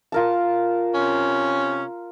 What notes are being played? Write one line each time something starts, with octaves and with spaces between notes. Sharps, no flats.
F4 A#4 A5
C3 C#4